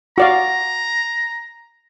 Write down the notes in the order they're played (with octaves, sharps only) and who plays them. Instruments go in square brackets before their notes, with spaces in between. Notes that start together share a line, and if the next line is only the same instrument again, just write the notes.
[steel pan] F#4 D5 F5 [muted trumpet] A#5